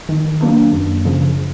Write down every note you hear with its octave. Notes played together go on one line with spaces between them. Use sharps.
D#3
F#3 A#3 D4
F#2
C#3 F3